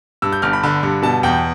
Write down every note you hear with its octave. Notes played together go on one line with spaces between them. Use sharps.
G2 E6
G6
G1 F6
B5
D3 B5
G2
B2 A5
E2 G5